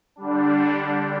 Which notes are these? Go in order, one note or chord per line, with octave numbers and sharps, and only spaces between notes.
D3 G3 D4